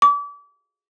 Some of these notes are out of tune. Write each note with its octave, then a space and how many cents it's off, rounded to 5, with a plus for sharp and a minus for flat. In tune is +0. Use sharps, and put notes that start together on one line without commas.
D6 -35